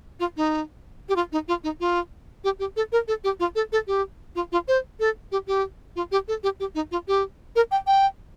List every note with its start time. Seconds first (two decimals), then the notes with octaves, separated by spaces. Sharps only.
0.20 F4
0.37 D#4
1.09 G4
1.16 F4
1.32 D#4
1.48 F4
1.64 D#4
1.80 F4
2.44 G4
2.59 G4
2.76 A4
2.92 A#4
3.08 A4
3.24 G4
3.40 F4
3.55 A4
3.72 A4
3.87 G4
4.35 F4
4.52 F4
4.68 C5
5.00 A4
5.32 G4
5.47 G4
5.96 F4
6.12 G4
6.28 A4
6.43 G4
6.60 G4
6.75 D#4
6.92 F4
7.08 G4
7.56 A#4
7.71 G5
7.87 G5